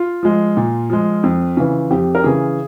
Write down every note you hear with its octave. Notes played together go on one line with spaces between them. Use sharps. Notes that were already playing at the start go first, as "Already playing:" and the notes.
Already playing: F4
F3 G#3
A#2
F3 G#3
F2
C#3 E3
F2 G4
A#4
C#3 E3 G#4